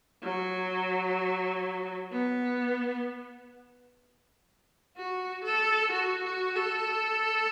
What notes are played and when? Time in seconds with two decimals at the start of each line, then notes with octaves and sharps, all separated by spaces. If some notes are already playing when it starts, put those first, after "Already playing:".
0.22 F#3
2.12 B3
4.97 F#4
5.44 A4
5.92 F#4
6.24 F#4
6.55 A4